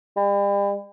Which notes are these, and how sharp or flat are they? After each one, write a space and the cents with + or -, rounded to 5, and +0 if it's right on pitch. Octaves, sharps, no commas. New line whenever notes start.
G3 +40